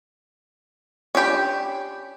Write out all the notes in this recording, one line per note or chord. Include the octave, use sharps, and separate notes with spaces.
C#4 D4 G4 B5